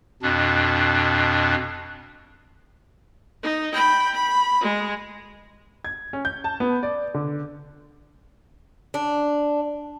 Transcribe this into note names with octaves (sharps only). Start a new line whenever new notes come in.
F2 B2 D4
D#4
G5 B5
B5
G#3
G#6
C#4
G6
A5
B3
D5
D3
D4